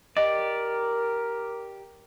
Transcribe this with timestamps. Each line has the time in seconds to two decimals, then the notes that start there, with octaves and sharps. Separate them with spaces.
0.17 G4 A#4 D5 D#5